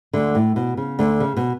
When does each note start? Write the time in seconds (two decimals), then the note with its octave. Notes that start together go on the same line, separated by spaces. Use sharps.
0.13 D2 D3
0.35 A2
0.56 B2
0.77 C#3
0.99 D2 D3
1.20 C#3
1.37 B2